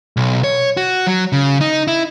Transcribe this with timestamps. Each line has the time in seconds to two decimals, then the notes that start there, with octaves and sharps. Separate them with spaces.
0.17 B1
0.44 C#5
0.77 F#4
1.07 F#3
1.32 C#3
1.61 D#4
1.88 E4